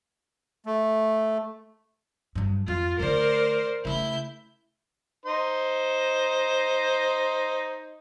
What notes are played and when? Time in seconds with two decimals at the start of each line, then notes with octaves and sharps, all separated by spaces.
0.66 A3
2.35 G2 F#3
2.68 F2 F4
3.00 D3 A3 A#4 C5 D5
3.85 C#3 A3 E4 G6
5.26 D#4 C5